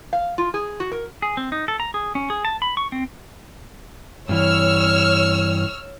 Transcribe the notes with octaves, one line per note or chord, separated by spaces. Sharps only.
F5
F4
G#4
F#4
A#4
G#4
C4
D#4
A4
A#5
G#4
C#4
G#4
A5
B5
C#6
C4
G2 E3 C#5 E6 F6